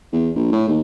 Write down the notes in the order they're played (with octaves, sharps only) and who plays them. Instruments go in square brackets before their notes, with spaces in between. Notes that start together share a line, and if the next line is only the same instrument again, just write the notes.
[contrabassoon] E2
A#1
A2
D#2